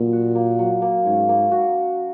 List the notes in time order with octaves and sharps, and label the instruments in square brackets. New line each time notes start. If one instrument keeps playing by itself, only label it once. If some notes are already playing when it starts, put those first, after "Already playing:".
Already playing: [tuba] A#2 [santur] F#3
[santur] F#4
A#3
F#3
A#3
[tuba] G#2 [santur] C#4
[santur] A#3
F#4